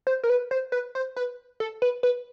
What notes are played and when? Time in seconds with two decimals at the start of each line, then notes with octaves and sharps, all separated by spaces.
0.07 C5
0.24 A#4
0.29 B4
0.51 C5
0.72 B4
0.95 C5
1.16 B4
1.60 A4
1.82 B4
2.03 B4